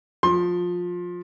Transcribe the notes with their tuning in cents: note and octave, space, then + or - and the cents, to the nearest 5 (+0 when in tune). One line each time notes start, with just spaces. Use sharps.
F3 +20 C6 +25